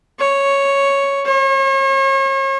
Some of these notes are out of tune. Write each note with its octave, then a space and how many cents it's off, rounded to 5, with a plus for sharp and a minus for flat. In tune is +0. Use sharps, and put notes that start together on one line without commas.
C#5 +0
C#5 -40